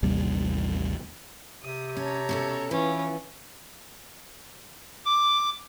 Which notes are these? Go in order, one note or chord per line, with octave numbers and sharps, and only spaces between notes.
A1 D#2 C3 G3
C3 D#6
C#4 C#5 A5 A#5
B2 C#4 A4
E3 C#4 E4 F4 B4
D6